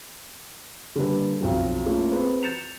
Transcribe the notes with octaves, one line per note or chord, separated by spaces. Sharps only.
D3 G3 A#3 B4
B1 F2 F#3
A3 A#3 C#4 E4 F4 A#4
C4 G#4 B4
G6 A6 C#7 E7 F7